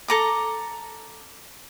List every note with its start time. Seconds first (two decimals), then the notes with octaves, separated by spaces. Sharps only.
0.08 A4 A#5 D6